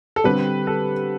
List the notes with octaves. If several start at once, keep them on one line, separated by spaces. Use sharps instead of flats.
A4
D3 G3 C4 G4 B4
A4